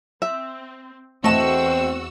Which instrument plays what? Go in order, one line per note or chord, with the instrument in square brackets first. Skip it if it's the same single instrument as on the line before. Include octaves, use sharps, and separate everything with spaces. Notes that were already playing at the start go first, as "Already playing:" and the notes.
[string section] C4 [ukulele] E5
[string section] E2 F#4 E6 [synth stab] A3 E7 [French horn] C4 [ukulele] D#5 A5